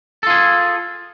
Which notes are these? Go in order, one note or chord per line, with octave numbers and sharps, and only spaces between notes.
F4 G#4 A4